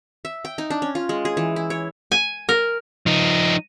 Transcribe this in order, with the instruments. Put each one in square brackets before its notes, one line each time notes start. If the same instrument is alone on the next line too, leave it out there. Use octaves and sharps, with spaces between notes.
[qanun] E5
G5
D#4
D4
C#4
F4
G#3
G#4
E3
E4
C#5
[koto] G#5
A#4
[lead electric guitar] F3 D#4